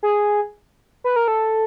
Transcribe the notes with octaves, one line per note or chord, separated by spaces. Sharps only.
G#4
B4
A#4
A4